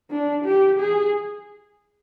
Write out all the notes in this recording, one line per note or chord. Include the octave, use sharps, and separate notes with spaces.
D4
G4
G#4